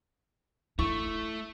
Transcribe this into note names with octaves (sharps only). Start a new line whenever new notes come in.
A3 E4 C#6